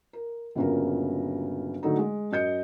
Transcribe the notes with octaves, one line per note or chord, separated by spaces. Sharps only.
A#4
G1 A#2 C#3 F#3 A#4
D3 F#3 A3 D#4
G#3
F#2 D#5 G6 C#7